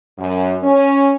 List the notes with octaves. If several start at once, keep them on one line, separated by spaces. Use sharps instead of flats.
F#2
C#4